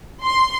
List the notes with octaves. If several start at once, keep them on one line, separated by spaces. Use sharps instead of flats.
C6